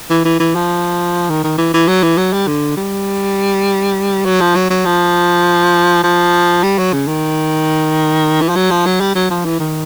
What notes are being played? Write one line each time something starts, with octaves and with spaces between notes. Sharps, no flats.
E3
E3
E3
F3
D#3
D#3
E3
E3
F#3
E3
F#3
G3
D3
G3
F#3
F3
F#3
F#3
F3
F3
G3
F#3
C#3
D#3
E3
F3
F#3
F3
F#3
G3
F#3
F3
E3
D#3